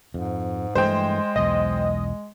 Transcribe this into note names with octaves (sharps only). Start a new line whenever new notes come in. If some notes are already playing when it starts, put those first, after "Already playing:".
F2 G#2
G2 E3 G#3 A3 C5 G5
B1 E2 D#5